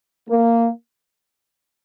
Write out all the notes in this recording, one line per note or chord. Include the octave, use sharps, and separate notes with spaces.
A#3